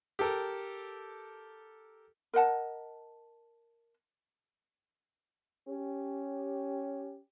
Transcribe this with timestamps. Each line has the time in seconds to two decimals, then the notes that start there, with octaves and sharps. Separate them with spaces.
0.19 G4 A4 A#4
2.33 A#4 D#5 F#5 A5
5.68 C#4 G4